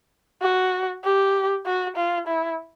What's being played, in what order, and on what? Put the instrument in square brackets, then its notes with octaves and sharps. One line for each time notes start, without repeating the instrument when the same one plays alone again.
[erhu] F#4
G4
F#4
F4
E4